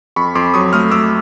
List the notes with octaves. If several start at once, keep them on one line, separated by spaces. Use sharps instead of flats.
F2 B5 C#6
F2 C6 D6
F#3 C#6 D#6
A3 D#6 F6
A3 D6 E6